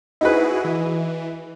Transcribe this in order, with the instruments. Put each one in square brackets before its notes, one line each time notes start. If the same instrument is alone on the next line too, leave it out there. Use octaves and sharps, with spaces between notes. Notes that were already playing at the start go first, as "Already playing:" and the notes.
[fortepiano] D#4 B4 [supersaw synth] E4 F#4 G#4
[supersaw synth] E3